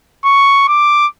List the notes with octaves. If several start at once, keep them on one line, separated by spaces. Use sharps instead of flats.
C#6
D6